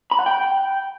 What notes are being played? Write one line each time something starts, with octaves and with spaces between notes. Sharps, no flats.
B5
F#5
G5